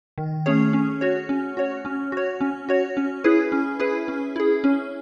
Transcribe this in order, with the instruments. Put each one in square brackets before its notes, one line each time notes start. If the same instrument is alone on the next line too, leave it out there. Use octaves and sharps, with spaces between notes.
[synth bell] D#3
A3 C#4 G#4 C#5
C#4
F#4 C#5
C#4
F#4 C#5
C#4
F#4 C#5
C#4
F#4 C#5
C#4
E4 G#4 B4
C#4
E4 G#4 B4
C#4
E4 G#4
C#4